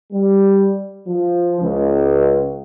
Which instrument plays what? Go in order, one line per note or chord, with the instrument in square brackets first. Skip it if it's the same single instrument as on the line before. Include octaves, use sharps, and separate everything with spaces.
[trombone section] G3
F3
C#2